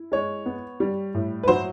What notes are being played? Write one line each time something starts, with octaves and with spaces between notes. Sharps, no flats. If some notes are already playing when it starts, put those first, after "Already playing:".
Already playing: E4
G#3 C#5
B3
G3
A2
B4
F#3 C5